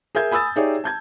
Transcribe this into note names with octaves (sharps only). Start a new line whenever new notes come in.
G#4 A#4 E5 G6 G#6
G#5 B5 D#6 E6 A6
D#4 G4 G#4 C#5 D5 E5
A5 G6 G#6